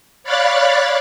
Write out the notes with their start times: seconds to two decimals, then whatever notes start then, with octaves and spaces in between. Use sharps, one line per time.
0.23 C#5 D5 F5 B5 F#6 A6